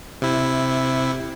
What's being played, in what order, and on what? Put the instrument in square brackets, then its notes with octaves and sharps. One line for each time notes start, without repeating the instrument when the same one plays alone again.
[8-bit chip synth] C3 E4